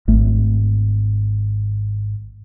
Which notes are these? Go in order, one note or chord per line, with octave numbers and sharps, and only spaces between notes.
G#1 A3